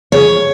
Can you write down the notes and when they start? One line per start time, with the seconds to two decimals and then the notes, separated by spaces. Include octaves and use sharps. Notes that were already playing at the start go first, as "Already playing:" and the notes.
0.12 C#3 C#5